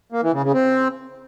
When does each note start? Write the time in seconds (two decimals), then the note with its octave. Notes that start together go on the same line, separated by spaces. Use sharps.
0.12 A#3
0.23 E3
0.33 C#3
0.44 C#3
0.54 C4